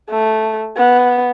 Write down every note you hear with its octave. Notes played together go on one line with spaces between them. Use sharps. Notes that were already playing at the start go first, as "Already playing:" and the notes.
A3
B3